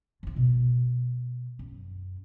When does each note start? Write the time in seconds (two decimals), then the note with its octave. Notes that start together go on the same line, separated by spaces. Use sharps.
0.23 F3 F4
0.36 B2
1.59 F#2